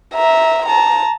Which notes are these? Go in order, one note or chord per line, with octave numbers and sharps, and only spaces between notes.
E5 A#5
A5 A#5